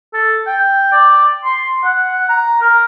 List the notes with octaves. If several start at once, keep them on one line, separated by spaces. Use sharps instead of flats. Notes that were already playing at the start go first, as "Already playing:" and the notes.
A4
G5
D5
C6
F#5
A#5
A#4